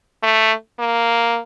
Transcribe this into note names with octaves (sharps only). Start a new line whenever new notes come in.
A3
A#3